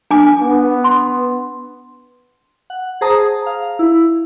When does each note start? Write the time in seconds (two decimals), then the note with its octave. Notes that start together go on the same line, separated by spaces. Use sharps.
0.11 D4 G#5 D6
0.41 B3
0.84 C6
2.70 F#5
3.01 G#4 C5 A5 A#5 D#6
3.46 F5
3.79 E4